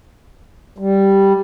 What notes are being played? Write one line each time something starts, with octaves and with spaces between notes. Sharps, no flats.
G3